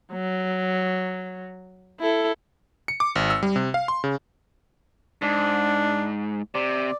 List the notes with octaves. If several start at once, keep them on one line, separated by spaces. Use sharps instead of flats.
F#3
E4 A4
C#7
D6
G#1
E6
G3
C3
F5
C6
C#3
G#2 D4
C3 D5